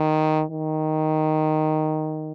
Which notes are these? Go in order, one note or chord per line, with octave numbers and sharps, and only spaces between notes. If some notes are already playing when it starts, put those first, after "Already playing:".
Already playing: D#3
D#3